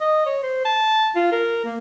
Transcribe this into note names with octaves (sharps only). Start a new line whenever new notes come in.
D#5
C#5
C5
A5
F4
A#4
A#3